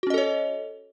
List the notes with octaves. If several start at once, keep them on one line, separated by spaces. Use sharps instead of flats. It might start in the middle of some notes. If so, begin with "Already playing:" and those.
C#4 F#4 A4 C#5 D#5